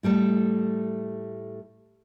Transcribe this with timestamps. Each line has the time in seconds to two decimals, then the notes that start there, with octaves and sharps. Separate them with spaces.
0.03 A2 G3 A3 A4